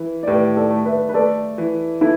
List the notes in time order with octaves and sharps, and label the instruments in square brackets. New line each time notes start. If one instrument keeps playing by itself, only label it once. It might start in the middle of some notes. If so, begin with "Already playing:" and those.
Already playing: [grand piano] E3
[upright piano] D5
[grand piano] A2 [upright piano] G4 B4
[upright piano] A4 D5
[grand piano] A3
[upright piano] B4 E5
B4
[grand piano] A3 [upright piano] A4 D5
[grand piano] E3
[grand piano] E3 [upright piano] E4 A4